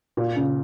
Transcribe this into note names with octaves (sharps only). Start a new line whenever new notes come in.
A#2
C#3